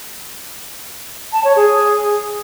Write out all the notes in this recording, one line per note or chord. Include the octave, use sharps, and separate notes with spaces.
A5
C#5
G#4